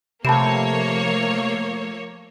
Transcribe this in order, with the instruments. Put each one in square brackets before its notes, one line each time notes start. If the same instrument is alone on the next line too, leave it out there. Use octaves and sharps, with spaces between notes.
[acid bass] C3 [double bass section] F3 A3 [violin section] A#3 C#5 [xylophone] A5 B5 E7